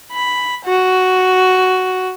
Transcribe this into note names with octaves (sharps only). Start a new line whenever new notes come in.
B5
F#4